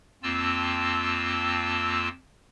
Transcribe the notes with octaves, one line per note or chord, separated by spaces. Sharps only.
F2 A#3 C4 F4 A5 E6